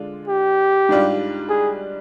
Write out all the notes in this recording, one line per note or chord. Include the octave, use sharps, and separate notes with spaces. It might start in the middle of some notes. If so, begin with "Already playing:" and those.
Already playing: D3 G#3 D4 F4
G4
G#2 G3 D4 F4
G#4